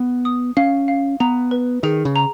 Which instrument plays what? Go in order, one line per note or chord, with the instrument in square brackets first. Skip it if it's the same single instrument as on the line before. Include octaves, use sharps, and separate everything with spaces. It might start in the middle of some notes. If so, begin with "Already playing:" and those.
Already playing: [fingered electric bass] B3
[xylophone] D#6
[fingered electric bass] C#4 [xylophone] F5
[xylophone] F5
[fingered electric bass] B3 [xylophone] A#5
[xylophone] B4
[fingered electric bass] D#3 [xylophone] G#4
[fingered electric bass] C#3
[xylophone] A#5